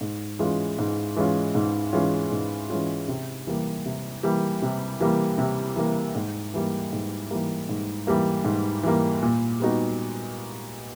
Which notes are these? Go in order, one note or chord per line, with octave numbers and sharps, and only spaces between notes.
G#2
E3 G#3 C#4 F4
G#2
E3 G#3 C#4 F4
G#2
E3 G#3 C#4 F4
G#2
E3 G#3 C#4 F4
C3
E3 G3 A#3
C3
E3 G3 A#3
C3
E3 G3 A#3
C3
E3 G3 A#3
G#2
E3 G3 A#3
G#2
E3 G3 A#3
G#2
E3 G3 A#3
G#2
E3 G3 A#3
A#2
G3 B3 D#4 F#4